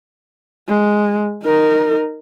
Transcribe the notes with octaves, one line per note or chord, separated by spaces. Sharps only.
G#3
D#4 A#4